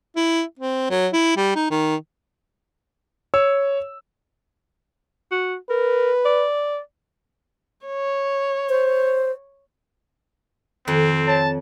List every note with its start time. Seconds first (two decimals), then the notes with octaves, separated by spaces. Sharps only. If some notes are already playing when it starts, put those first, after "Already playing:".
0.16 E4
0.59 C4
0.90 F#3
1.13 E4
1.37 G3
1.55 D#4
1.71 D#3
3.34 C#5 E6
5.31 F#4
5.70 A#4 B4
6.25 D5
7.86 C#5
8.69 C5
10.88 F2 D#3 C4
11.27 C#5 A5